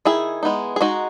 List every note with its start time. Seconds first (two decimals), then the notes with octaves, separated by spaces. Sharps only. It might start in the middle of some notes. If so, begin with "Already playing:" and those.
0.05 D#3 E4 G#4
0.43 G#3 B3 D#4
0.76 G#4
0.81 G#3 D#4 F#4